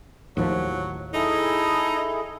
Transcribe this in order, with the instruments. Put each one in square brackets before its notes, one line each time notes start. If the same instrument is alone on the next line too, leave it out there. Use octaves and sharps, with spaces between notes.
[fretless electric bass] D#2 A2 F3 [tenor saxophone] F#3
[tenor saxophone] D#4 [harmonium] E4 G#4 A4